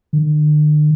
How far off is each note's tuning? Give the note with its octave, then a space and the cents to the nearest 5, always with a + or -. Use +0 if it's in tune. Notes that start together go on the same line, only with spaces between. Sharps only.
D3 +45